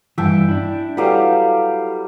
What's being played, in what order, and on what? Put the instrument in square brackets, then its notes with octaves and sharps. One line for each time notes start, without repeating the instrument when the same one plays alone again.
[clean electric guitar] G2 E3 [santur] E5 G5 A5
[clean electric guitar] D4 E4
[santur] F#3 G3 F5 [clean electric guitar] E4 A4 B4